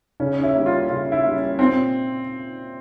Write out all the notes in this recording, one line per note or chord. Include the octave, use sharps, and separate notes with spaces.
C#3 C#4
C#4
E4
G3 A#3
F4
C#3 F4
E4
G3 A#3
C#4
A#2 C4